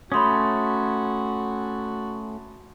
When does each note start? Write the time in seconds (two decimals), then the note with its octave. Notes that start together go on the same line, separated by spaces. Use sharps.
0.12 A3 C#4 F#4 B5 C6 D#6